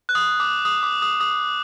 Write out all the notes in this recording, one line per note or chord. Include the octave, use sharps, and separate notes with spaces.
F#6
D#6
D6
D#6
D6
D#6
D#6